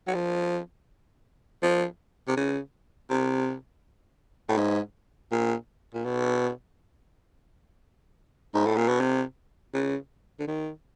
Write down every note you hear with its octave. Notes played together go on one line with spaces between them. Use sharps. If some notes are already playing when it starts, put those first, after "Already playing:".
F#3
F3
F3
C3
C#3
C3
A2
G#2
A#2
A#2
B2
G#2
A2
A#2
B2
C3
C#3
D3
D#3